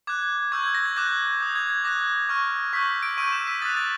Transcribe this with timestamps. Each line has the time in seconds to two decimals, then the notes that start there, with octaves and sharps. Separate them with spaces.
0.07 D6 F#6 G#6
0.52 C#6 E6 G6 G#6
0.64 G#6
0.75 A#6
0.86 G#6
0.97 D6 F#6 G6
1.40 D#6 G6
1.55 G#6
1.70 G#6
1.84 D6 F#6 A#6
2.29 C#6 F6
2.73 C#6 E6 G6 B6
3.03 D7
3.18 C#6 E6 G6 D#7
3.32 E7
3.47 B6
3.62 D#6 F#6 A6
3.77 A6